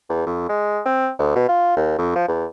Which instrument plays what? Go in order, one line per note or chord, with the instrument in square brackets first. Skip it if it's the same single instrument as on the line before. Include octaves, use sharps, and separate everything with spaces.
[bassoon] E2
F2
G#3
C4
D2
B2
F4
D#2
F2
F3
E2